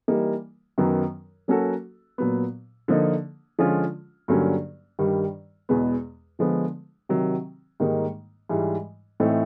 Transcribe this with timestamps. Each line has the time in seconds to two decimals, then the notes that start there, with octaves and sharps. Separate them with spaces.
0.08 E3 G3 A#3 D#4
0.78 F#2 D#3 F#3 B3
1.48 F#3 A#3 C#4 F#4 A4
2.18 A#2 F#3 B3
2.88 D3 F3 A#3 D#4
3.59 D3 F3 G#3 C#4 F4
4.28 G2 D3 F#3 A#3 C#4
4.99 G2 D#3 G3
5.69 E2 B2 G#3 B3
6.39 D3 F3 G#3 B3
7.09 C3 D#3 F#3
7.80 G#2 D#3 G3 A#3 D#4
8.49 G#2 E3 G3
9.20 A2 E3 A3 C4 D#4